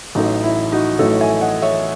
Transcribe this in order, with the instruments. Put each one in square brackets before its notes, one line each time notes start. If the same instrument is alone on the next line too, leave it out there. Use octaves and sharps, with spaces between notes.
[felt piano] A1 A2 F#3 A3 D#4
E4
D#4 F#4
A1 A2 F#3 A3 A4 C#5
E5 G#5
D#5 F#5
C#5 E5